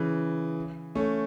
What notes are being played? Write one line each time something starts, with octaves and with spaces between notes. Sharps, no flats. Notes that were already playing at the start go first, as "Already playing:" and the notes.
Already playing: C#3 E3
A3 C#4